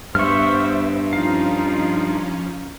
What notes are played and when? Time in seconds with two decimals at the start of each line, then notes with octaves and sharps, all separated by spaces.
0.15 G2 B3 C5 E5 C#6 F6
1.13 F3 C#4 D#4 F4 F5